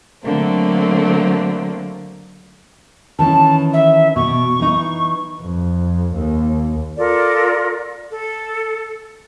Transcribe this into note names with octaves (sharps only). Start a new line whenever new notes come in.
D3 F#3 A3 A#3 C4
D#3 E3 C#4 A5
E5
B2 C#6
E3 D#4
F2
D#2
F4 A4 A#4 D5
A4